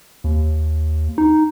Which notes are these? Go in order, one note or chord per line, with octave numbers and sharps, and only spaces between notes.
D#2
D#4